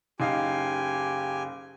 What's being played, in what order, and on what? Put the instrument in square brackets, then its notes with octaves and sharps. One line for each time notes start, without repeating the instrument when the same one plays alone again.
[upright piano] F#1 D#4 F5 [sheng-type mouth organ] G4 G#5